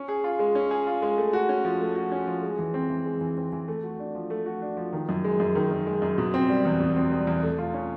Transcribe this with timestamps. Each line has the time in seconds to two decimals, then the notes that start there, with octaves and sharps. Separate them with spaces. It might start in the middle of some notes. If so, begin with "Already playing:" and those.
Already playing: C#4
0.08 G#4
0.24 F4
0.39 G#3
0.55 C#4
0.71 G#4
0.87 F4
1.02 G#3
1.18 A3
1.33 F#4
1.49 C#4
1.65 F3
1.81 A3
1.96 F#4
2.12 C#4
2.27 F3
2.43 G#3
2.59 E3
2.74 C4
2.90 E3
3.05 G#3
3.21 E3
3.37 C4
3.52 E3
3.68 A3
3.83 F#4
3.99 D4
4.15 F3
4.30 A3
4.46 F#4
4.62 D4
4.77 F3
4.93 D#3
5.09 F#2
5.24 G#3
5.40 F#2
5.55 D#3
5.71 F#2
5.87 G#3
6.02 F#2
6.18 B2
6.34 C4
6.49 G3
6.65 E2
6.80 B2
6.96 C4
7.12 G3
7.27 E2
7.43 A3
7.58 F4
7.74 C#4